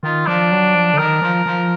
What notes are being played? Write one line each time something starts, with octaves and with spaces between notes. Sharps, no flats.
D#3 F4
F3 D4
F#3
F3
D3
D#3 A#4
F3
F3